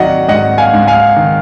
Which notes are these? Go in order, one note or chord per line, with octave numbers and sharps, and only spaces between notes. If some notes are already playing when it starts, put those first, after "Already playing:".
Already playing: D#3 F#3 D5 D#5 F#5
G#2 D#5 F#5
F5 G#5
G#2
F5 G#5
D#3